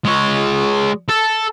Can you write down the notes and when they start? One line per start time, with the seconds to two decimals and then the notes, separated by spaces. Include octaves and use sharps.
0.05 G#3 C#5
1.09 A4